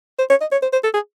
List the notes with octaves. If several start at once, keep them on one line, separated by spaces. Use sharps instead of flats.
C5
C#5
D#5
C#5
C5
C5
A4
G#4